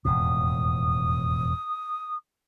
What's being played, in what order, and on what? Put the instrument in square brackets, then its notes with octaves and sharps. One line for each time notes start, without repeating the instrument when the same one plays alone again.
[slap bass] E1 F2 A2 [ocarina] D#6